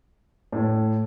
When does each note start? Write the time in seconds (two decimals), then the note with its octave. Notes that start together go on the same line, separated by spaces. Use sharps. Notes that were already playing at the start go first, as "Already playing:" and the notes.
0.52 A2